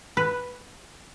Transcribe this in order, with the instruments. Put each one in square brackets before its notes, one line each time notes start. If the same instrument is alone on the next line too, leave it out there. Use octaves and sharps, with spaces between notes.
[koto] B4